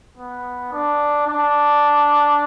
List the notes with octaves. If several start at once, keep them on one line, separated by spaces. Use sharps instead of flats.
B3
D4
D4